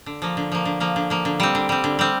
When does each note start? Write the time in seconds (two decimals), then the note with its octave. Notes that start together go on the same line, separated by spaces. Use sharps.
0.06 D3
0.22 F3 A#3
0.37 D3
0.52 F3 A#3
0.65 D3
0.80 F3 A#3
0.96 D3
1.10 F3 A#3
1.25 D3
1.40 G3 C4
1.55 D3
1.69 G3 C4
1.84 D3
1.99 G3 C4